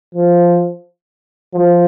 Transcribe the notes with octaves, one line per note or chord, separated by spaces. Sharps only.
F3
F3